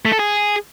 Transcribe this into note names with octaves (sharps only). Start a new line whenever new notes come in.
A3
A4
G#4